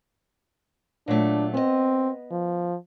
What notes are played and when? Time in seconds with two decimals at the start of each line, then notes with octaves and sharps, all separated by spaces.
1.08 A#2 F#3 A3 D4
1.54 B3 C4 D#5
2.32 F3